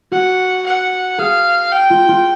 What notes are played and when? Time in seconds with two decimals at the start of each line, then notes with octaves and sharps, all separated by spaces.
0.12 F#4 F#5
0.66 F#5
1.18 G#4 F5
1.72 G5
1.90 F4
2.09 F4